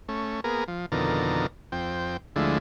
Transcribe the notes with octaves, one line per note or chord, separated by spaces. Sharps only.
A3 C#4
A#3 B3 G#4 A#4
F3
F2 B2 D3 D#3 A4 A#4
F2 C4 G5
D2 D3 F3 G#3 A3 E4